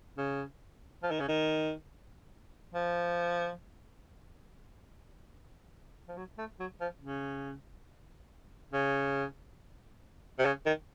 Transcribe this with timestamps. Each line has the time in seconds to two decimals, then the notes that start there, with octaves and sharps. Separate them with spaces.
0.18 C#3
1.03 F3
1.11 D#3
1.20 C#3
1.28 D#3
2.74 F3
6.08 F3
6.17 F#3
6.38 A3
6.60 F#3
6.81 F3
7.02 C#3
8.73 C#3
10.39 C3
10.45 C#3
10.66 D#3